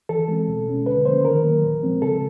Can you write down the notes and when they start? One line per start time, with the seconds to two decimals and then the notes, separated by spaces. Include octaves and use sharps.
0.09 E3 A4
0.28 G#3 C4
0.48 B2
0.67 G#3 C#4
0.86 D3 B4
1.05 F3 A#3 C#4 C5
1.25 D#3 A#4
1.44 F#3 A#3
1.63 A#2
1.82 F3 G#3 C4
2.02 C#3 A4